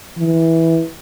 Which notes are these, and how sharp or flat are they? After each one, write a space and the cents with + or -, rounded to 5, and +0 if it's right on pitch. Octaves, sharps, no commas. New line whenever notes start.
E3 -10